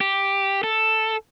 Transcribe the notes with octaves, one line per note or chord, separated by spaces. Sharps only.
G4
A4